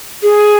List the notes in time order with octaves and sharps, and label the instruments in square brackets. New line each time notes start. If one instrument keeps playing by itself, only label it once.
[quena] G#4